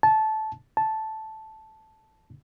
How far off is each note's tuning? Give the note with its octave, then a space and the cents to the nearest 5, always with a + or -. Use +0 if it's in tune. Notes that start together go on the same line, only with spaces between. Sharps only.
A5 -15
A5 -5